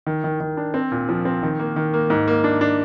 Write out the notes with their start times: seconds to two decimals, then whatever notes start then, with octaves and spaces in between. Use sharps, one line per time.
0.07 D#3
0.24 D#3
0.40 D#3
0.57 D4
0.74 C4
0.92 A#2
1.09 F3
1.25 C4
1.43 D#3
1.59 A#3
1.76 D#3
1.94 A#3
2.10 G#2
2.28 A#3
2.44 D4
2.61 D4